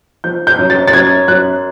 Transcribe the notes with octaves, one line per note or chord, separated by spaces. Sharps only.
F3 G6
G6
F#2
A6
A6
F#2 G#6
F#2 F#6